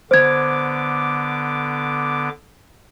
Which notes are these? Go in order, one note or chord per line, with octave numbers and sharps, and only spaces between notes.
D3 B3 C5 D6 G#6